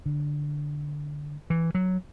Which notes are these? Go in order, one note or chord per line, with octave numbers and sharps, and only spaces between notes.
D3
E3
F#3